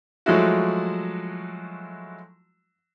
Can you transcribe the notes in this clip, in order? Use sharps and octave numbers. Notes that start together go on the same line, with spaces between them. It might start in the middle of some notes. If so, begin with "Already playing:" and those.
F3 F#3 G#3 A3 E4 F#4